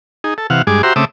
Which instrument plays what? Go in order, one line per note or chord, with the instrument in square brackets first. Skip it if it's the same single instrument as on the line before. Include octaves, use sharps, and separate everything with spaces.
[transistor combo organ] D#4 G#4
A4
C3 E3 F5 F#5
G2 G#3 G#4 D6
F#4 G4 C5 E5 A#5 C6
C#3 A3 C4 E5 D6 D#6